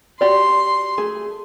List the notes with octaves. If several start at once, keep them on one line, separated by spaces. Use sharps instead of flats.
F#4 G4 D5 C6
A3 G#4